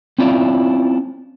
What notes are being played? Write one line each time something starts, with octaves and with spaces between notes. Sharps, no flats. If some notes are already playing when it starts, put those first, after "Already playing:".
C4 C#4 E4 F4 D5